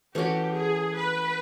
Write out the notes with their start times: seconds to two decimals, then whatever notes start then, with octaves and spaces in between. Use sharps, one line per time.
0.15 E3 A3 C#4 F#4 G4
0.55 G#4
0.96 B4